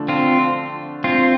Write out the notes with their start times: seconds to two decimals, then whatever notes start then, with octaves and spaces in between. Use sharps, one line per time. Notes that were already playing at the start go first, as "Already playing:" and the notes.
Already playing: D3 F3 A3 D4
0.08 C4 F4
1.04 C4 F4